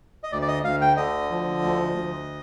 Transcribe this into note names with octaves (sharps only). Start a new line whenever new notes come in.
D#5
D2 D5
D5
D#5
D2 F5
G5
D3 D#5
F3
D2
D2